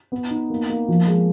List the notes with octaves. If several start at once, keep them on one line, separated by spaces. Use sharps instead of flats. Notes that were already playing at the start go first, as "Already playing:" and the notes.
B3
D#4
A#3
A#3
F3
G#3